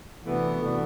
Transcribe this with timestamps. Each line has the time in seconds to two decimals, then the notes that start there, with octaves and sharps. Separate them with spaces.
0.25 C3 E3 A3 B3 D4 F#4
0.61 C3 E3 A3 D4 F#4